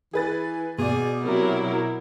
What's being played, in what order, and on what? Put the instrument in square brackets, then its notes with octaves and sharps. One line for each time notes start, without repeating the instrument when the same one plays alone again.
[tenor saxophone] E3 [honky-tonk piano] G#4 B4 A6
[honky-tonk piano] B2 D5 [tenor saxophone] G#4
[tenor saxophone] C3 [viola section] F#3 E4 A#4